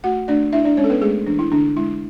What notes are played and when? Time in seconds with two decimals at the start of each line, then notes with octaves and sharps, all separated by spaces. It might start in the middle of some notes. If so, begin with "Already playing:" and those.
0.04 A3 F#4 F#5
0.28 A3 D4 D5
0.53 D4 E4 E5
0.65 D4 D5
0.77 G#3 C#4 C#5
0.84 A4
0.90 B3 B4
1.02 G#3 A3 G#4
1.27 E3 D4
1.39 E4
1.52 D3 D4
1.76 G#3 E4